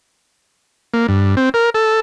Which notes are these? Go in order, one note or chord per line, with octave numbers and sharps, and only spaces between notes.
A#3
G2
C4
A#4
A4